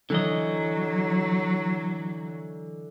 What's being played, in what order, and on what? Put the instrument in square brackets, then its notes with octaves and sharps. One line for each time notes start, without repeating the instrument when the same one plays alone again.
[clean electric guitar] D3 E3 D#5 [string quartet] F#3